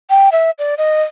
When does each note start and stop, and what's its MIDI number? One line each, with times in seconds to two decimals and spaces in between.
0.10 0.29 79
0.32 0.51 76
0.59 0.75 74
0.78 1.03 75